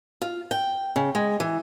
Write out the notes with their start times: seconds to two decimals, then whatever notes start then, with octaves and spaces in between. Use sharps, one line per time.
0.22 F4
0.51 G5
0.96 C#3
1.15 G#3
1.40 E3